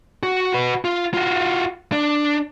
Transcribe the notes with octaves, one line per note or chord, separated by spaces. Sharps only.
F#4
F#4 B4
F4
F4 F#4
D4